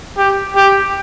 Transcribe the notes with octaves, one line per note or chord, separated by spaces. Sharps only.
G4
G4